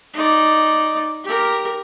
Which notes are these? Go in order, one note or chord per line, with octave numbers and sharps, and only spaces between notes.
D#4 D5
G4 A#4